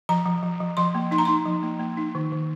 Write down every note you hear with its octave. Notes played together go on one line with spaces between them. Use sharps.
F3 A#5
F3
F3
F3
F3 C6
A#3
D#4 C6
A#5
D#4 C6
F3
A#3
A#3
D#4
D#3
D#3